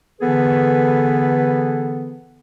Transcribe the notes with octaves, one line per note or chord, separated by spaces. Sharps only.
D3 E3 B3 G#4 A4 B4